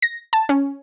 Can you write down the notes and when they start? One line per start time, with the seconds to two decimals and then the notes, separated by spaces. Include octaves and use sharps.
0.02 A#6
0.33 A5
0.49 C#4